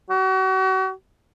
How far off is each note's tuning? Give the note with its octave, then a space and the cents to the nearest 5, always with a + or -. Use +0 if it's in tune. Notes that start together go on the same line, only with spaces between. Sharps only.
F#4 +35